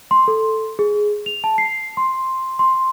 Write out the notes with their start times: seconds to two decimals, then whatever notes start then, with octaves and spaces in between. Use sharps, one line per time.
0.11 C6
0.28 A4
0.79 G#4
1.26 F7
1.44 A5
1.58 C7
1.97 C6
2.59 C6